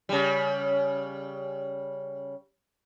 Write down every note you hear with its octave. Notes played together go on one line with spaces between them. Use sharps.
C#3 G3